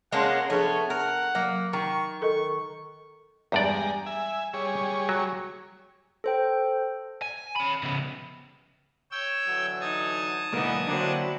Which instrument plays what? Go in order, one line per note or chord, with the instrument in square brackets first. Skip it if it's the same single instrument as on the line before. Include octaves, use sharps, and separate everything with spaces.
[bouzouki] G#3 A#3 C#4 [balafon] D#5 A5 C6 [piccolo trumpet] F#5
[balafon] F3 D4 G#4 [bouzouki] A3 B3 [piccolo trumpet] C#5
[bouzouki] A#4 [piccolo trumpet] F#5
[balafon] F#3 [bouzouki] A#3
[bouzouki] D#3 [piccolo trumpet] C#6
[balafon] A4 A#4 D#5 [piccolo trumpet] C#6
[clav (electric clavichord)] E2 G2 D5 [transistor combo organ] G#3 G4 A#5
[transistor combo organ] E5 G#5
G3 G#4 C#5
[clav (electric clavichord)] F#3
[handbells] A4 C5 G5
[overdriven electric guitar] G#5
C#4 B5
C#3 B3
[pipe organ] C#5 G5 E6
[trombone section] D3 E3 F#3
[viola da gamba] D#4 [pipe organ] A5 D#6 G#6
[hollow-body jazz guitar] B1 G#2 A#3 [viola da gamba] D3 E4 [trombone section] E3 B3 D#4
[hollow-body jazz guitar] D3 A#3 [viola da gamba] F#3 E4 F#4 [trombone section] C4 D4